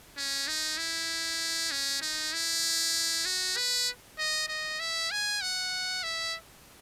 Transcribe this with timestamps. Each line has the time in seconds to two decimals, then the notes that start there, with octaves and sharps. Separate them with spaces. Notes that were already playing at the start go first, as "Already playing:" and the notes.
0.17 C#4
0.48 D#4
0.78 E4
1.71 C#4
2.02 D#4
2.33 E4
3.26 F#4
3.56 B4
4.18 D#5
4.48 D#5
4.80 E5
5.11 G#5
5.41 F#5
6.03 E5